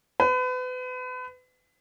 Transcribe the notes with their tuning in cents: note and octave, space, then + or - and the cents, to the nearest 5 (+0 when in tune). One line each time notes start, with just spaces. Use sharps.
B4 +35